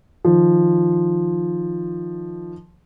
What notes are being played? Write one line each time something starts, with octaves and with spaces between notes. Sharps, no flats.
D#3 F3